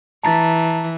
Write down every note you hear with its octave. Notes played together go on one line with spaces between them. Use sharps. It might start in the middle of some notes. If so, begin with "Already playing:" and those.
E3 A5 A#5 A6